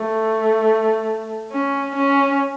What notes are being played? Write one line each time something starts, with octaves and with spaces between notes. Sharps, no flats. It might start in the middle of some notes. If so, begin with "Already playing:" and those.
Already playing: A3
C#4
C#4